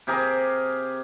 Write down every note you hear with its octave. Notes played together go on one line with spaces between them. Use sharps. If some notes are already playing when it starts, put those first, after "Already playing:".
C3 G4 G#4 A#4